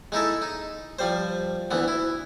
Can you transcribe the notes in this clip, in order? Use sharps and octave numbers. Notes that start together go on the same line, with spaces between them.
G#3 D#4 E4 A4
D#4
F3 G3 C5
D2 E3 B3
E4